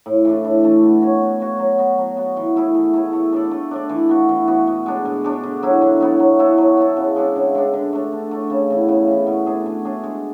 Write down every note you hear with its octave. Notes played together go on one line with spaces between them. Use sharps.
A2
E3 A3 D4
A2
E3 A3 D4
B3
F#4 C#5
B3
F#4 C#5
F#3
B3 F#4
F#3
B3 F#4
E3
A3 E4 G#4
E3
A3 E4 G#4
A3
D4 A4 D5
A3
D4 A4 D5
E3
B3 F#4
E3
B3 F#4
B2
G#3 D4
B2
G#3 D4
D3
F#3 B3 E4
D3
F#3 B3 E4
F#3
B3 E4 A4
F#3
B3 E4 A4
C#3
G#3 D4
C#3
G#3 D4
D3
A3 D4
D3
A3 D4
C#3
E3 B3
C#3
E3 B3
B2
A3 D4 G#4
B2
A3 D4 G#4
G#3